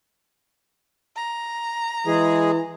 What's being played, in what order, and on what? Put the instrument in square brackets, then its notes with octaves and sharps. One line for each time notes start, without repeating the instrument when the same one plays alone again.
[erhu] A#5
[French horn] E3 [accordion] G#3 G#4